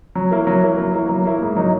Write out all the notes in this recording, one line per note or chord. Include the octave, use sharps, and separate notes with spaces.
F#3
A#3 E4 A#4
F#3
A#3 E4 A#4
F#3
A#3 E4 A#4
F#3
A#3 E4 A#4
G#2
F#3 A#3 D#4